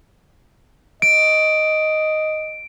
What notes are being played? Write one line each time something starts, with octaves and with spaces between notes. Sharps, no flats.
D#5 D7